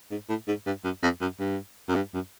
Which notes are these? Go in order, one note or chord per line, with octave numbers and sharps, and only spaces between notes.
G#2
A2
G#2
G2
F#2
F2
F#2
G2
F#2
G2
F#2